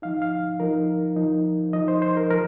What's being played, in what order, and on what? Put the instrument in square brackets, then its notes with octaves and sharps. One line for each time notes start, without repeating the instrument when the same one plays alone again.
[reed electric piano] F3 D#4 F5
F5
F3 D#4 A#4
F3 D#4
F3 D#4 D#5
C5
C5
A#4
F3 A#4